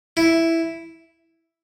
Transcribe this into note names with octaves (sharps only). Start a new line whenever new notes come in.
E4